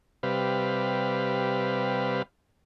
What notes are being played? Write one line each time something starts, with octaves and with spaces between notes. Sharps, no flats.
C3 G3 B4 F5